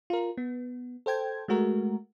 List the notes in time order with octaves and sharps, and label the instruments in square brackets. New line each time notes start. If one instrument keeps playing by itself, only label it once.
[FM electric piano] F4 A#4
B3
A4 C5 G5 G#6
G#3 A3 F#4 A#4